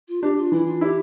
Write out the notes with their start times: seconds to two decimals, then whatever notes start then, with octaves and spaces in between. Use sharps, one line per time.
0.08 F4
0.22 D4 G4
0.36 F4
0.52 E3 E4
0.66 F4
0.81 E4 G4